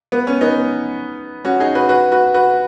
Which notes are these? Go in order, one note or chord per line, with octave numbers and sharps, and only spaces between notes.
B3
C#4
B3 D#4
C#4 F#4
D#4 G#4
F#4 B4
F#4 B4
F#4 B4
F#4 B4